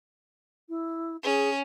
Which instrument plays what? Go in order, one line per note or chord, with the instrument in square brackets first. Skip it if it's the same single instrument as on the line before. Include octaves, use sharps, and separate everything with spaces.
[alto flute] E4
[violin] C#4 [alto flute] G#4